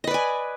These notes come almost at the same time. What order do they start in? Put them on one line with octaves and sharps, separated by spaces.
D#5 B4 D5 G#5